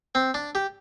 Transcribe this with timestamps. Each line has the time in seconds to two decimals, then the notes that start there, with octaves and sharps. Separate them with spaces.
0.15 C4
0.34 D4
0.55 G4